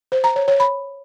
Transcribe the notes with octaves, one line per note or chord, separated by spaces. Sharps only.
C5
A#5
C#5
C#5
B5